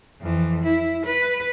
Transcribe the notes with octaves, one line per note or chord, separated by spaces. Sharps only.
F2 E3
E4
B4